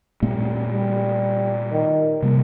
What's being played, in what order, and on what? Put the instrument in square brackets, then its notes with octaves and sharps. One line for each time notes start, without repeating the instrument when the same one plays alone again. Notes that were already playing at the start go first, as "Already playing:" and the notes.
[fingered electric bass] A#2 A3 C4 [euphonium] G3
[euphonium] G3
D#3
[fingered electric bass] C3 G3 A#3